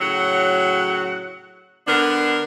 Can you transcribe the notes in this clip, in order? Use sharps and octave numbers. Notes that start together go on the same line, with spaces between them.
A2 C#3 F#3 F#4 F#5
D3 B3 D4 A#4